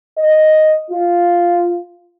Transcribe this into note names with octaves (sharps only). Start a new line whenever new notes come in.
D#5
F4